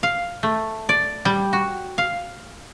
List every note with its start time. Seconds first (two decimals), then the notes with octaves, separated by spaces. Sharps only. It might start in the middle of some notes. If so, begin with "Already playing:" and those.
0.03 F5
0.43 A3
0.89 D5
1.25 G3
1.53 F#4
1.98 F5